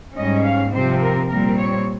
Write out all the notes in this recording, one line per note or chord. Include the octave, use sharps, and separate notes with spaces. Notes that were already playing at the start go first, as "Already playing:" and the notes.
G#2 G3 C#4 D#5
F5
C3 F3 C4 C5
A#4
A#2 G3 C4 A#4
C#5